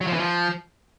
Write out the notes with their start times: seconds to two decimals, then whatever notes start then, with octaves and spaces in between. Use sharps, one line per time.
0.01 F#3
0.07 F3
0.13 E3
0.20 F3